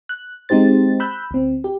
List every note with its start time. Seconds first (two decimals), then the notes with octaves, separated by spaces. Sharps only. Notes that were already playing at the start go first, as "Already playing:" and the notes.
0.09 F#6
0.49 G#3 C4 D#4 G4 C5 A6
1.00 B5 E6 F#6 G6
1.31 D2 C4
1.64 G4